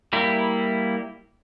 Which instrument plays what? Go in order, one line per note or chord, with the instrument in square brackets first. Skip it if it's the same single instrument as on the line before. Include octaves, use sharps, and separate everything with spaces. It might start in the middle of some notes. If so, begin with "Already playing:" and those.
[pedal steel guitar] G3 A#3 E4